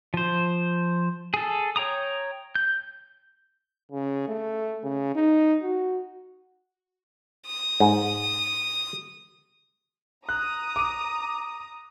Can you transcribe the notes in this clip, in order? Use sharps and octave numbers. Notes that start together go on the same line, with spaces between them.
F3 C5
G#4 A4
C#5 G5 A#5 D#6
G6
C#3
A3
C#3
D#4
F#4
D#6
G#2
A#5 D#6 F#6
D6 D#7